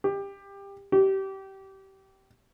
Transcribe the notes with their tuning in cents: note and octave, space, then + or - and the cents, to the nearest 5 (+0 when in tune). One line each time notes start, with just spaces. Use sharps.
G4 +20
G4 -25